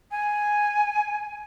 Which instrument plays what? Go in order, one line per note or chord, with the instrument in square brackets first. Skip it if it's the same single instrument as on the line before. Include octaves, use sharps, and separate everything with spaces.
[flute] G#5